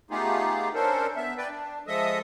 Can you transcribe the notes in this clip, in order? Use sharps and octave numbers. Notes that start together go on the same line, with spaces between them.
A3 B3 D#4 F4 G4 G#4
C#4 D4 A4 A#4 C5
B3 E5
B4 D5 G5
D4
F3 G#3 A4 D#5 E5 D#6